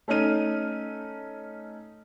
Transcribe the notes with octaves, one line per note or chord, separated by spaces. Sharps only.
A3 C#4 D#4 F6 D#7